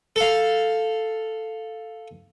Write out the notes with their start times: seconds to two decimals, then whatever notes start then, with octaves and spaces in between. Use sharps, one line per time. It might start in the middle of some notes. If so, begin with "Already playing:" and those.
0.16 A4 F5